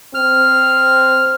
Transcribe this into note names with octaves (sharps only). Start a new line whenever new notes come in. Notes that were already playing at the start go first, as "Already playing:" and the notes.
C4 F6